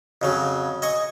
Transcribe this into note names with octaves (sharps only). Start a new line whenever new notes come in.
F2 C#3 F#3
D#5 G#5 C#6 D#6